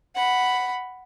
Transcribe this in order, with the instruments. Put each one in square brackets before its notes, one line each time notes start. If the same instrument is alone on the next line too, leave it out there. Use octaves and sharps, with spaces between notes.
[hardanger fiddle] F#5 B5